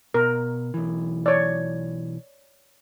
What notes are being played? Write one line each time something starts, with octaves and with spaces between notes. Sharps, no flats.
B2 A#4
B1 E3
C#5 D5